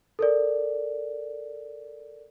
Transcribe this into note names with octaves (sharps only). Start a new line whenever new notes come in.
A4 A#4 D5